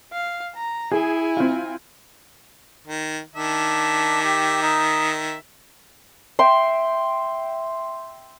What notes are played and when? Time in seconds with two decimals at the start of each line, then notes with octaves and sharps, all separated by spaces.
0.13 F5
0.56 A#5
0.92 E4 G#4 G#5
1.37 C4 F4
2.87 D#3
3.36 D#3 D4 E5
4.22 G4
4.62 D#4
6.39 E5 G5 C6